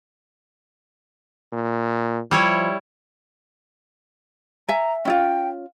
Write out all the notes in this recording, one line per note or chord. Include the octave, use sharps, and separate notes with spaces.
A#2
F3 G3 E4 C#5
E5 G#5 A#5
C#4 E4 F4 G5